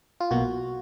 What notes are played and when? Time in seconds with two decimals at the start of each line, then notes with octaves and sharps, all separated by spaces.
0.20 F4
0.31 B1 B2 A#3 F#4